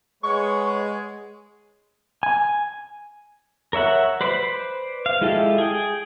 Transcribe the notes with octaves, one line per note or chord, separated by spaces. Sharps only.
G#3 G#4 B4 C#5 F#5 C#6
G#5
A#4 C#5 E5 F#5
B4 C5 D5 B5
F5
G#3 E4 F4 G4 A4
G#4 G5